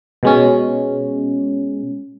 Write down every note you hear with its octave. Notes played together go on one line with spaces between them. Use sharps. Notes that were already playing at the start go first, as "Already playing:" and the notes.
B2 G#3 C#4